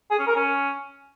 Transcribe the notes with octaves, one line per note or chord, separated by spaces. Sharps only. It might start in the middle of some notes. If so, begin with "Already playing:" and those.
G#4
C#4
A#4
C#4